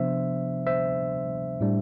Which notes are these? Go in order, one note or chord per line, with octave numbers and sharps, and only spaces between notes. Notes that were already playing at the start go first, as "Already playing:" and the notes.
Already playing: C3 F3 B3 D4 C5 E5
C5 E5
A2 G3 D4